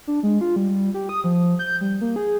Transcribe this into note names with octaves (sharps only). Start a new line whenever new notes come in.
D4
G#3
F4
G3
G4
D#6
F3
G6
G3
A#3
G#4